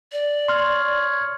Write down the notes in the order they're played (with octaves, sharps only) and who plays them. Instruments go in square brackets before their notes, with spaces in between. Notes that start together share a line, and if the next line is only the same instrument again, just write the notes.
[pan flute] D5
[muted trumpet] C#5 [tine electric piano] C6 F6